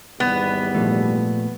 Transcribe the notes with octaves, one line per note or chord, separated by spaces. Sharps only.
G#1 E2 G3 B3
A#2 F3 A3